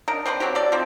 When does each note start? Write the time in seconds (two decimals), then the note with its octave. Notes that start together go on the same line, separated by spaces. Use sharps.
0.08 D4 D#4 A#4
0.26 C4 D4 B4 C5
0.40 F#3 C4 F#4 G4
0.55 A4 D5
0.72 F3 C4 D#4